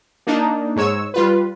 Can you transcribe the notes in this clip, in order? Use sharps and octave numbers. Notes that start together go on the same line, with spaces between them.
A#3 D4 D#4
G#2 G#3 C#5 E6
G3 F4 B4